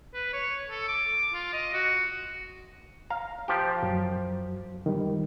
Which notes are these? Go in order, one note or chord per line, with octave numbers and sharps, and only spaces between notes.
B4
C#5
A4
D6
F4
D#5
F#4
F5 A#5
F3 G4
F#2 F#3
D#3 G3